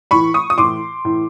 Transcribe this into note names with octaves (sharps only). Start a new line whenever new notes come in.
A2 E3 B5 C#6
C#6 D#6
D#6
A2 E3 C6 D6
A2 E3